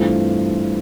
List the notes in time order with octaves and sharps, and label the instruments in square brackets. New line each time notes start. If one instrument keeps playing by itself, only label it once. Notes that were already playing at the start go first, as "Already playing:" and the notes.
Already playing: [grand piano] G2 E3 A3 C4 F4